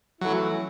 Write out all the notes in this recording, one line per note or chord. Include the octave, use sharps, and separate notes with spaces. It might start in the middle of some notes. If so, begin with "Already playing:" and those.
E3 F#3 A3 C#4 E4